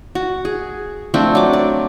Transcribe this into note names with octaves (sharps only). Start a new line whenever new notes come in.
F#4
G#4
F3 A3 C4 D4
F#3 D6
D5